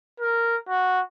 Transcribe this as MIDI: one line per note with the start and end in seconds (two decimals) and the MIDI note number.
0.20 0.57 70
0.69 1.01 66